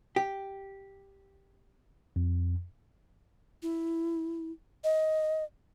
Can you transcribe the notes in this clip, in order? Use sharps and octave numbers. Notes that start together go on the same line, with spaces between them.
G4
F2
E4
D#5